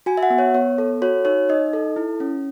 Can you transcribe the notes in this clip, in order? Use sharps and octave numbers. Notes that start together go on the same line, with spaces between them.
F#4 G#5
E5
F#5
B3
C#5
B3 C#5
A4
F#4 C#5
D#4 C#5
D#4 D#5
A4
E4
C#4